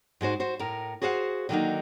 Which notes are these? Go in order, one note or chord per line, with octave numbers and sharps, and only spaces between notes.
G#2 G#3 F#4 C5
F#4 C5
A2 A#4
F#4 G#4 C5 F5 F#5
D3 D#3 F#3 G3 A#3 D#4